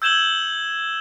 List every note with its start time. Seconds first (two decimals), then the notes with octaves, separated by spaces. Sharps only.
0.02 E6 G6 G#6 E7 F#7 G7